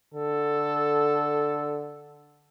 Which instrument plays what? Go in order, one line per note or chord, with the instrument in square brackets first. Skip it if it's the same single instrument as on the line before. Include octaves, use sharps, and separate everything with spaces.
[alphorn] D3 [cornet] A4